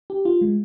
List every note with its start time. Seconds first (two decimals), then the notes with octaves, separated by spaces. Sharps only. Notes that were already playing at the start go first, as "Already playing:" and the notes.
0.10 G4
0.25 F4
0.41 G#3